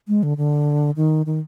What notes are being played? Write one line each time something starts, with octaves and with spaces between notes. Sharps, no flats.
G#3
D3
D3
D#3
D#3